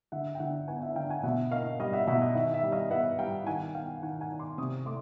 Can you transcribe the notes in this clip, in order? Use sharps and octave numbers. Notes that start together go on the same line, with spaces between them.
D3 E5 F#5
G5
D3 E5 F#5
B3 F#5 G#5
E5 F#5
D3 F5 G5
F#5 G#5
B2 E5 F#5
A#3 D#5 F5
G3 D#5 F5
E5 F#5
B2 E5 F#5
D#5
D#3 E5
E5
G3
D#5 F5
B3 E5 F#5
G3 F5 G5
D#3 F#5 G#5
B3 F5 G5
D#3 F#5 G#5
F#5 G#5
D#3
C6 D6
C3 C#6 D#6
A3 C6 D6